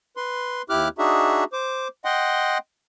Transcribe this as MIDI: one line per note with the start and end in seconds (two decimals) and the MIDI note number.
0.17 0.62 71
0.17 0.62 84
0.70 0.88 39
0.70 0.88 64
0.70 0.88 67
0.70 0.88 86
0.70 0.88 89
0.70 0.88 90
0.99 1.44 62
0.99 1.44 63
0.99 1.44 66
0.99 1.44 68
0.99 1.44 76
1.53 1.88 72
1.53 1.88 86
2.05 2.58 75
2.05 2.58 78
2.05 2.58 79
2.05 2.58 84